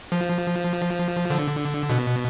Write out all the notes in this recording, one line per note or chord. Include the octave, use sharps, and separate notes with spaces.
F3
D3
B2